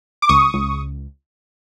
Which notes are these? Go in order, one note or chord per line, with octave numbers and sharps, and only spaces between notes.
D6
C#2 C#6 D#6
C#2